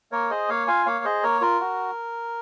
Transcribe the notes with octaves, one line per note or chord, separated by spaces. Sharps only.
A#3 A#4 C#5
G#4 C5 D#5
A#3 C#5 F5
F4 F5 G#5
A#3 C#5 F5
G#4 C5 D#5
A#3 A#4 C#5
F4 A#4
F#4